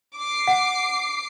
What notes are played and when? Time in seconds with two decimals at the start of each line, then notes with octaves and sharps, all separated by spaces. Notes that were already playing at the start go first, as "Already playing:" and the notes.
0.18 D6 C7
0.47 F#5